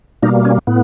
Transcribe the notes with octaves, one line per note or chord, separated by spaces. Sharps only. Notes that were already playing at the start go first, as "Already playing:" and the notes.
B2 G3 A#3 D#4
C#4
A2 B3